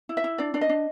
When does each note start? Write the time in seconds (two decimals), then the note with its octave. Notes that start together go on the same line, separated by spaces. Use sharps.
0.09 E4
0.17 E5
0.24 E4
0.38 D4 D5
0.54 D4 D5
0.61 D#5
0.69 D4